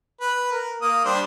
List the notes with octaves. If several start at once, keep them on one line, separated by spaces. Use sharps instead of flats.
B4
A#4
A#3 D#6
G3 D4 C5